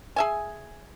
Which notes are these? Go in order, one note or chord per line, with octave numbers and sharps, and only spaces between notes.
G#4 E5 G#5